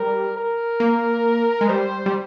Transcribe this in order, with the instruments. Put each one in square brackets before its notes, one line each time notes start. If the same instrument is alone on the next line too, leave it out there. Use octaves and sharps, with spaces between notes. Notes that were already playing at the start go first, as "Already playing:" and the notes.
Already playing: [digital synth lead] G3 [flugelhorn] A#4
[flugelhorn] A#4
[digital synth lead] A#3
G#3
[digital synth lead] G3 [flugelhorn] C5
[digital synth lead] G3